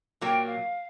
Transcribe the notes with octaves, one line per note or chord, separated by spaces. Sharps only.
A#2 F#3 A#3 G5
F5